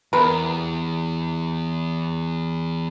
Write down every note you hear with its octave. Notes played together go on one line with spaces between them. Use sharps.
E2 C3 A#4 B4